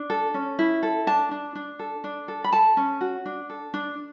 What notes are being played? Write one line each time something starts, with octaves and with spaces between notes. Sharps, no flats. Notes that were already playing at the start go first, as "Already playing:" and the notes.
Already playing: D4
A4
C#4
E4
A4
D4 A5
D4
D4
A4
D4
A4
B5
A4 A5
C#4
F#4
D4
A4
D4